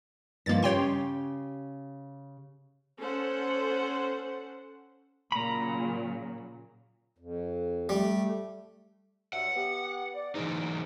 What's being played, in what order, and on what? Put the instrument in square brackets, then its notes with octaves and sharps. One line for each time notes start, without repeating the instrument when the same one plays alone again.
[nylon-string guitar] G2 D#3 F3 [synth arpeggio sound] A#3 A6
[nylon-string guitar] C#3 G4 [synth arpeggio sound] C#5 G5 C6
[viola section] C#4 A4 C5 F#5
[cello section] A#2 C#3 F#3 [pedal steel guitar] A#5 B5
[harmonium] F2
[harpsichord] G3 [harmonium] A3
[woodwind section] G2 F#3 E5 [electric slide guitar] F#5
[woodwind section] B3 G4
D5
[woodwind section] G#2 [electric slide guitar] E3 F#3 D#4